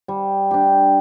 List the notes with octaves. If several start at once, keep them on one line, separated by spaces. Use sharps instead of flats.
G3
D4 G4